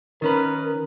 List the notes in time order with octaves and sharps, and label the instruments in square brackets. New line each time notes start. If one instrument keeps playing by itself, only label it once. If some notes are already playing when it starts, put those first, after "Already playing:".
[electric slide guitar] D#3 C#4 B4 [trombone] A#4